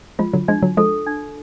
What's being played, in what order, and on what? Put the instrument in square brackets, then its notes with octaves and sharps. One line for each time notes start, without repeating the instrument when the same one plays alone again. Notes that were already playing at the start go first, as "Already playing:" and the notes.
[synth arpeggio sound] F3 G#3 [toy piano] F4
[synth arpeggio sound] D3 F#3
[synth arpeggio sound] F3 G#3 [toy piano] D4
[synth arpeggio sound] D3 F#3
[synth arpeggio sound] F3 G#3 [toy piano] A4
[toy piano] D4